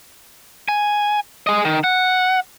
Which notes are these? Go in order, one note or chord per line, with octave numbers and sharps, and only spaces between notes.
G#5
G#4 D#5
D#3
F#5